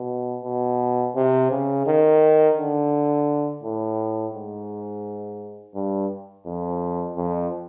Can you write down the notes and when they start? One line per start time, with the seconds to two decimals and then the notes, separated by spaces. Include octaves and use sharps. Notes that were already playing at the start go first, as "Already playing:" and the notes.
Already playing: B2
0.45 B2
1.15 C3
1.51 C#3
1.87 D#3
2.57 D3
3.63 A2
4.34 G#2
5.75 G2
6.46 F2
7.16 F2